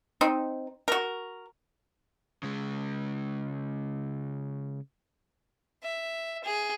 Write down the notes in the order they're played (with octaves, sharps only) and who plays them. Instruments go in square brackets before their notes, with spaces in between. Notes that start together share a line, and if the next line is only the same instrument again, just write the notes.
[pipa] C4 D#4
F#4 A#4
[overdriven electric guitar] C#3 G#3
[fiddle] E5
G#4